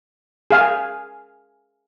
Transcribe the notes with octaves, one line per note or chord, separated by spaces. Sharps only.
G#4 F5 G#5